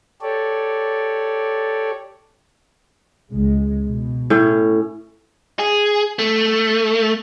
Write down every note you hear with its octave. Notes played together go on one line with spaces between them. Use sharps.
G4 A4 C#5 D5
C#2 G#3
B2
A2 C#4
G#4
A3